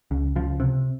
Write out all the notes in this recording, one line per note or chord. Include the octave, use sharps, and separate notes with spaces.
C#2
C#2 F3
C3